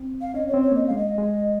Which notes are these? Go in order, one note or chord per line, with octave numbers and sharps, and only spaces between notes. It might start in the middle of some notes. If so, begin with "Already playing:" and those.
Already playing: C4
F5
C#4 D#5
C#5
C4
C#5
A#3 D#5
G#3 F5
D#5
G#3